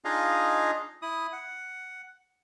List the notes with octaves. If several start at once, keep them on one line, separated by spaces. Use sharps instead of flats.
D4 D#4 F4 G#4 D#5 F5
E4 D#6
F#5